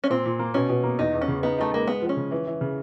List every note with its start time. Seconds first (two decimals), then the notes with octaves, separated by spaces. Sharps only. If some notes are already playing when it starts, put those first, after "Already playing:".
0.04 C#4
0.10 A#2 C4
0.25 A#2
0.39 A#3
0.54 B2 C#4
0.70 B2
0.84 A#3
0.99 E2 D#4
1.14 E2
1.21 C#4
1.28 C#3
1.43 B3 D#4
1.58 A3 D#4
1.73 G#3 A#3
1.87 G#3 B3
2.02 F3
2.09 C#4
2.17 C#3
2.31 E3
2.47 E3
2.61 C#3